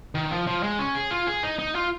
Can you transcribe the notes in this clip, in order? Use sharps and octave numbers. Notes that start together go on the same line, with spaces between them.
D#3
F3
F3
G#3
C#4
G#4
F4
G#4
D#4
D#4
F4